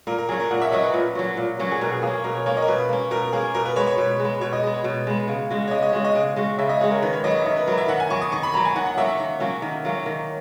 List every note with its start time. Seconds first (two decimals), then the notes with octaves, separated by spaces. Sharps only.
0.07 A#2 A#4
0.18 A#4
0.29 F#3 G#4
0.32 C#4 F#4
0.40 A#4
0.51 A#2 F#5
0.61 E5
0.72 F#3 C#4 F#4 D#5
0.83 B4
0.94 A#2
1.15 F#3 C#4 F#4
1.37 A#2
1.59 F#3 C#4 F#4
1.71 G#4
1.81 B2 A#4
1.92 G#4
2.02 A#3 G#4
2.07 C#4
2.14 A#4
2.24 B2 A#4
2.35 C#5
2.46 A#3 C#4 C#5
2.57 D#5
2.62 A#4
2.68 B2 B4
2.89 A#3 C#4
3.11 B2 A#4
3.33 A#3 C#4 G#4
3.54 B2 A#4
3.65 B4
3.76 G#3 B3 C#5
3.87 C#5
3.98 B2
4.20 G#3
4.25 B3
4.41 B2 C#5
4.53 D#5
4.63 G#3 B3
4.74 C#5
4.84 B2
5.07 G#3 B3
5.28 C#3
5.50 G#3 C#4 F#4
5.67 C#5
5.71 C#3 D#5
5.83 D#5
5.93 G#3 C#4 F#4 D#5
6.05 D#5
6.15 C#3
6.36 G#3 C#4 F#4
6.58 C#3 E5
6.69 D#5
6.81 G#3 C#4 F#4 C#5
6.91 A#4
7.02 D#3 B4
7.13 C#5
7.24 F#3 B3 D#5
7.42 E5
7.46 D#3 D#5
7.56 B4
7.67 F#3 B3 A#4
7.78 E5
7.88 D#3 F#5
8.00 G#5
8.10 F#3 B3 C#6
8.21 D#6
8.32 D#3 C#6
8.43 B5
8.54 F#3 B3 A#5
8.65 G#5
8.76 D#3 F#5
8.86 F#5
8.97 F#3 A#3 C#4 E5
9.19 D#3
9.40 F#3 A#3 C#4
9.62 D#3
9.85 F#3 A#3 C#4
10.06 D#3